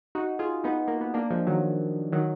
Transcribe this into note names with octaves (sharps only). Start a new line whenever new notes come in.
D#4 F#4
F4 G#4
B3 D#4
A#3
B3
A#3 D4
F3 G#3
D#3 F#3
D#3 F#3